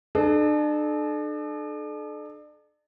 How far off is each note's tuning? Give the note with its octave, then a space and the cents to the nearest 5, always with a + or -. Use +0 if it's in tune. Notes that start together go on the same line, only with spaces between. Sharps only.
D4 +40 A4 -40